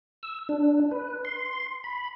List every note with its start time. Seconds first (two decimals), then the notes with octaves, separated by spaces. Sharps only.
0.23 E6
0.49 D4
0.91 B4
1.25 C6
1.84 B5